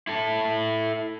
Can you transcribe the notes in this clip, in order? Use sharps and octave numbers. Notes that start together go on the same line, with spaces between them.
E4 A4